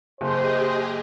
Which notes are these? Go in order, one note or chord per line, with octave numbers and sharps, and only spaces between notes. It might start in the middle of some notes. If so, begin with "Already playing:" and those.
F#1 G4 G#4 C5 D#5